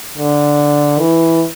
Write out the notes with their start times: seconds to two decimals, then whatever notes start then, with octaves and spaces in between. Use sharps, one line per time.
0.17 D3
0.99 E3